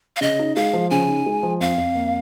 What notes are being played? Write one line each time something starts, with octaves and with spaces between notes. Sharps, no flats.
F5
C#3 D#5
D#4
G#3 F5
F3
C#3 G#5
D#4
G#3
F3
F2 F5
F2
A#3